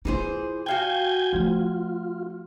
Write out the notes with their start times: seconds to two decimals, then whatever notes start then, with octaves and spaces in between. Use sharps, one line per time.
0.05 E3 D#4 F4 G#4 C5
0.66 F#4 F5 G5 G#5 G6 G#6
1.33 F3 A3 F4